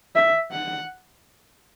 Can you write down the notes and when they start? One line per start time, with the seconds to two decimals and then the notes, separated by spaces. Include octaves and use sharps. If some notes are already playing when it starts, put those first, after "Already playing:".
0.16 E5
0.52 F#5